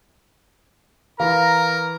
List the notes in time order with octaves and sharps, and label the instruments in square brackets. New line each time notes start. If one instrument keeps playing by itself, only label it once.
[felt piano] E3 [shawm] A#4 [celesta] F5 [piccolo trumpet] A#5